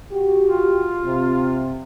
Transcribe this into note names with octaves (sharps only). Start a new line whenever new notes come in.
F#4 G4
F4
C3